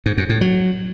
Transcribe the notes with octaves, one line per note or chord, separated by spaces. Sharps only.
G#2
F#2
A2
F#3